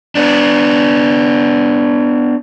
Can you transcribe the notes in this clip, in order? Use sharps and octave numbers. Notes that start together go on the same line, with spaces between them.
B3 D4